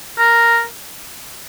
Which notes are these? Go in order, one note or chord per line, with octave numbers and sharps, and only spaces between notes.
A#4